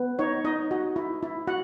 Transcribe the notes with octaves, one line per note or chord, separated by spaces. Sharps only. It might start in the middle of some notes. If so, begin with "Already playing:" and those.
Already playing: B3
D#4 C#5
D#4 D#5
F#4
E4
E4
F#4 F#5